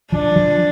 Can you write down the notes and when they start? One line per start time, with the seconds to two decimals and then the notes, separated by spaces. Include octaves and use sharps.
0.12 F3 D4
0.36 F3